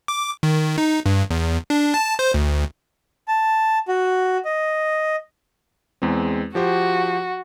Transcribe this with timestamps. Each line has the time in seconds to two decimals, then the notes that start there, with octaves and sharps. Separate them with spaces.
0.08 D6
0.43 D#3
0.78 D#4
1.06 G2
1.30 E2
1.70 D4
1.94 A5
2.19 C5
2.34 D2
3.28 A5
3.88 F#4
4.45 D#5
6.02 E2 G#3 C4
6.55 F3 F#4 G4 C5